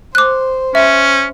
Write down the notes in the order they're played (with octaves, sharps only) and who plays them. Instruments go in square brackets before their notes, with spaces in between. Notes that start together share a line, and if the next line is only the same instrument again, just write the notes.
[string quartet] C5 [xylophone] D6 F#6
[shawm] C#4 [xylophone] E5